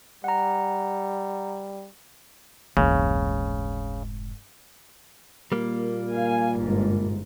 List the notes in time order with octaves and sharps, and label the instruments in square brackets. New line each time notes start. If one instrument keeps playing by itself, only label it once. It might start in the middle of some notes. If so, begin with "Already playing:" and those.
[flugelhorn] G3 [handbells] F#5 A#5
[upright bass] F1 G#2 [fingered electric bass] C#2 E3 A#3 [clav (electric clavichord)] C#3
[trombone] A#2 [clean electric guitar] G3 A#3
[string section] F5 G#5
G1 G#2